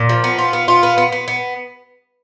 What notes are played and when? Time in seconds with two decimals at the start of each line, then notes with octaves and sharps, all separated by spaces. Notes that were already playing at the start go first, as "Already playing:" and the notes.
Already playing: A#2
0.09 F3
0.24 B3
0.38 F4
0.53 B3
0.68 F4
0.83 B3
0.98 B3
1.12 B3
1.28 B3